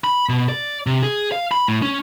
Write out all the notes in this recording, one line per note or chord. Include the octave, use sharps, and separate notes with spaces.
B5
B2
D5
C3
G#4
F5
B5
A2
C#4